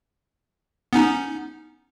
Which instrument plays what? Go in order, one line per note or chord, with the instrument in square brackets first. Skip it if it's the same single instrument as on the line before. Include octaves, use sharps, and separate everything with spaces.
[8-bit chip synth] B3 C#4 D#4